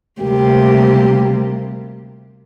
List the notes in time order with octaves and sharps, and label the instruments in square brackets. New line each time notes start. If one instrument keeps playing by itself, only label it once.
[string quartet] D2 C3 G3 A#3 G4